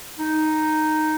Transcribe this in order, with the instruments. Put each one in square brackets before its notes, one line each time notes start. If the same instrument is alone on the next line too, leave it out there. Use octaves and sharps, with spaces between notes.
[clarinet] D#4